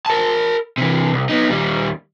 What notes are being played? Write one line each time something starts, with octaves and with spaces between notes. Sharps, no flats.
A#4 A5
C3 E3
C2
B3 D#4
D#2 G3